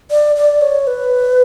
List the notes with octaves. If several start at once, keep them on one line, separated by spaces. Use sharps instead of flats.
D5
D5
C#5
B4